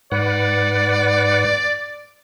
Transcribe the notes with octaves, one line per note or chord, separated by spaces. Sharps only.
G#2 B4 D5 F#5